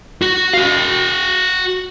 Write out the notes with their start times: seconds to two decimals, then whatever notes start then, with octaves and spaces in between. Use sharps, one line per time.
0.22 F#4
0.53 F#4 F5